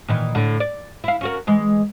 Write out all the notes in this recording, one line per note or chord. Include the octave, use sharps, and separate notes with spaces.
A#2 D#3 E3
A2 D3
D5
E4 F5
C#4 F#4 A#4
E3 G#3